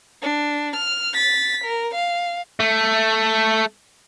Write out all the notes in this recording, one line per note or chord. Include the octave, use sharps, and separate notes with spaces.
D4
F6
A6 B6
A#4
F5
A3